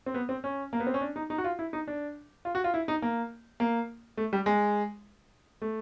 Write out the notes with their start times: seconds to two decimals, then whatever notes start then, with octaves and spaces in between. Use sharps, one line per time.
0.06 C4
0.14 B3
0.29 C4
0.44 C#4
0.73 A#3
0.80 B3
0.87 C4
0.94 C#4
1.01 D4
1.16 D#4
1.30 D#4
1.38 F#4
1.44 F4
1.59 E4
1.73 D#4
1.88 D4
2.45 F4
2.55 F#4
2.64 F4
2.74 E4
2.88 D#4
3.02 A#3
3.60 A#3
4.17 A3
4.33 G3
4.46 G#3
5.62 A3